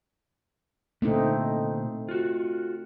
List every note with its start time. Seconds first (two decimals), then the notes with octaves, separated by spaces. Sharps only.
1.02 A#2 D3 A3 C4 D#4
2.09 F4 F#4